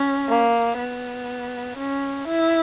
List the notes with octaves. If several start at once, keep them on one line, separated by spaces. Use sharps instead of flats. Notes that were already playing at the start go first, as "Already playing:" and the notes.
Already playing: C#4
A#3
B3
C#4
E4